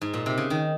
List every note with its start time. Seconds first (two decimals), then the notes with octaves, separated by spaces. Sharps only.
0.02 G#2
0.14 A#2
0.26 C3
0.38 C#3
0.50 D#3